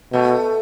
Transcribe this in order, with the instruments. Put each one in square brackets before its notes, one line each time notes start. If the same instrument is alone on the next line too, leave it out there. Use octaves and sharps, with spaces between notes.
[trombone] B2 [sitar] A3